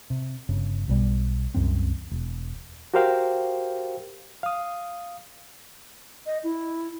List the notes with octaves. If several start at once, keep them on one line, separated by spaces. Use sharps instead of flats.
C3
G1 G2 C#3
B1 B2 G3
C2 F#2 E3 C4
E1
F#4 G4 A#4 C5 F5 G5
F5 D#6
D#5
E4